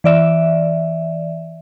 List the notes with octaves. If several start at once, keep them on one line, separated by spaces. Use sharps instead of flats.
E3 D5 E5